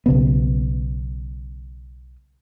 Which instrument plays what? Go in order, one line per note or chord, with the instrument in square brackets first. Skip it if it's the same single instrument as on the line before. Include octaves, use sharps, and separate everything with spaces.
[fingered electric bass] B1 C#3 B3